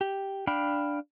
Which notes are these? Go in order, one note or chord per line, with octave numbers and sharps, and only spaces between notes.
G4
D4 F5 G5 B5